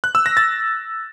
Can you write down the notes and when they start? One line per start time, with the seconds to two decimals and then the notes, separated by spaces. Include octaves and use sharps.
0.04 F#6
0.15 E6
0.26 A#6
0.37 A6